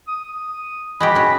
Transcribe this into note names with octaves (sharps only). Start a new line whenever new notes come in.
D#6
G#3 F#4 G4 B5
C#4 F#4